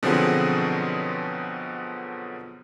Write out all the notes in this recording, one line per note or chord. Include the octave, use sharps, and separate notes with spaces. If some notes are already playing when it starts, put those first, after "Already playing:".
B2 D3 F3 F#3 C4 G#4